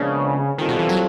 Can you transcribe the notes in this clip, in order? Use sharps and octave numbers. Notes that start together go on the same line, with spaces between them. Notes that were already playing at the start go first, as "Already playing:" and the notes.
Already playing: A#2 C#3 F3 G#3 B3 D4
A#2 D#3 G3 C4 F4 A4
B2
E3
F#3